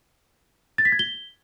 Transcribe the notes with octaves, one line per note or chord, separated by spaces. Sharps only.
A6
B6
G#6
G7